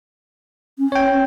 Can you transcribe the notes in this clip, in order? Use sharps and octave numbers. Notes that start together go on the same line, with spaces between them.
C#4
C#5 G5